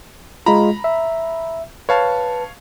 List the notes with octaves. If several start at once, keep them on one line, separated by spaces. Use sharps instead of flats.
G#3 F4 A#5 B5
E5
B4 C#5 F5 A5